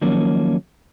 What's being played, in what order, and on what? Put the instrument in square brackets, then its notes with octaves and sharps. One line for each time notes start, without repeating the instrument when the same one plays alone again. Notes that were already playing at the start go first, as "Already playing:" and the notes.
[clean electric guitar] D#3 F3 F#3 A#3 C#4